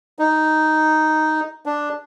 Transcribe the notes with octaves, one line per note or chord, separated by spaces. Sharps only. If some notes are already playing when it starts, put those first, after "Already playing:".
D#4
D4